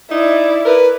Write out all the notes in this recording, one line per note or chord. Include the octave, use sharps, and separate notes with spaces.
D#4 E4 D5
A#4 B4